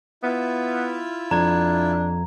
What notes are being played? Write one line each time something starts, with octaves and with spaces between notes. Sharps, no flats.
B3 E4 F4 E5
F2 D4 A#5 G#6